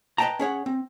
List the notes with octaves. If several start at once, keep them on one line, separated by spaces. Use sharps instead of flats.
B4 D#5 E5 G5 A5 A#5
C#4 G#4 C#5 F#5
C4